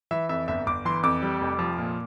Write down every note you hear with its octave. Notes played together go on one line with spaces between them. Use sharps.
E3 E5
F2 E5
G1 E5
G1 D6
E3 C6
F2 D6
G3
F1
F3
A#2